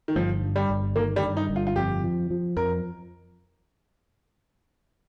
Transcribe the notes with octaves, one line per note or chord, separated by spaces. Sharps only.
D#3
G1 F3
G2
G3
G1
D#3 A#3
G3
G2
D#4
G1
F4
F4
F2 G4
F3
F3
F2 A#4